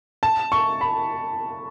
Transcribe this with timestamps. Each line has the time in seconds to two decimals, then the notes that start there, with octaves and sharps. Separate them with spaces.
0.23 A5
0.52 C#6
0.81 B5